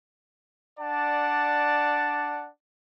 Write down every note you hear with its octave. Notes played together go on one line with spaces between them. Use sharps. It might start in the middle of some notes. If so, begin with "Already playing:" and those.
D4 D5 F#5 A5